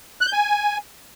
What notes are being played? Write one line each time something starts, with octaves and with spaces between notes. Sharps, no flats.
F#6
G6
G#5